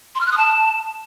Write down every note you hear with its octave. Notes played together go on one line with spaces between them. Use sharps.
C6
F6
F#6
D#6
A5